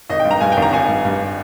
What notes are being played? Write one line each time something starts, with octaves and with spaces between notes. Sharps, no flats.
G#1 D#5
G5
G2
A#5
G2 G#5
G5
G#1
A#5
G#1 G#5
G2
G2